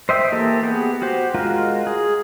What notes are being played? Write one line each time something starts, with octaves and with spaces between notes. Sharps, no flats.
C5 D#5 E5 G5
E3 A#3 G4 A4
B3 G4 G#4
F#4 G4 C5
G#3 F4 F#4 A#4
G#4